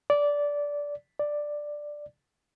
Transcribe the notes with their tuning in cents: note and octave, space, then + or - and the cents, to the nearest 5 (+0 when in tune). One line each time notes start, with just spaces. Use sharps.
D5 -15
D5 +5